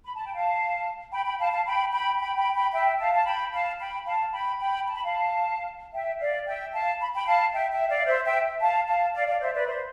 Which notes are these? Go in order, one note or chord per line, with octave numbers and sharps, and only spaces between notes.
B5
A5
G5
F5 A5
G5 B5
G5 B5
F5 A5
F5 A5
G5 B5
G5 B5
G5 B5
G5 B5
G5 B5
E5 G5
F5 A5
A5
G5 B5
F5 A5
G5 B5
F5 A5
G5 B5
G5 B5
A5
B5
F5 A5
E5 G5
D5 F5
E5 G5
F5 A5
B5
G5 B5
F5 A5
E5 G5
E5 G5
D5 F5
C5 E5
E5 G5
F5 A5
F5 A5
D5 F5
D5 F5
C5 E5
B4 D5
C5